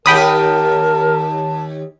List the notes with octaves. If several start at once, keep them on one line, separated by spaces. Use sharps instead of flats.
D#2 G4 A#4 G5 A5 B5 D#6